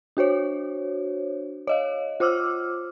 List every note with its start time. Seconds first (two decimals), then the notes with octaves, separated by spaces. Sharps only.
0.17 D4 F#4 C5 C#5
1.67 C#5 D#5 F5
2.20 F4 C5 D6 E6 F6